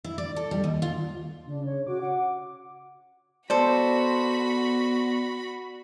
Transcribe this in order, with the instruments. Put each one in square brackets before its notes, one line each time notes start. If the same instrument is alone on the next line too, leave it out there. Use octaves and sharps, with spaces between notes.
[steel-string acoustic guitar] E4
D5
A4
G3
D#2
F4
[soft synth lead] C#3 [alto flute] D4
[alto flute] C#5
[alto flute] F#4 [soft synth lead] D6
[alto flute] F#5
[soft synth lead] B3 [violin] F#4 B5 [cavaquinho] A4 C5 [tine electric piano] D5